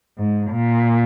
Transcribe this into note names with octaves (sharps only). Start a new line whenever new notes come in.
G#2
A#2